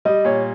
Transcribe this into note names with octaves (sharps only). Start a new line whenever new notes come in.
G3 D#5
A#2 C#5